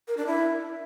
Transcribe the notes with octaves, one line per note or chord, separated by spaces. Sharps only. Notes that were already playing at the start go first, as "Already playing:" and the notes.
A#4
D4
E4